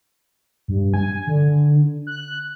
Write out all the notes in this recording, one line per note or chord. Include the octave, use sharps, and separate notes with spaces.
G2
G#5
D3
F#6